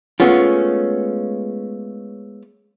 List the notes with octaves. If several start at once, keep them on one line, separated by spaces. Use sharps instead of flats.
G#3 A3 B3 C#4 F4